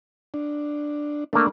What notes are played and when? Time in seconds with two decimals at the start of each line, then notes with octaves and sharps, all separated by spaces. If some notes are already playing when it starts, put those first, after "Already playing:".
0.34 D4
1.33 A3 A#3 D4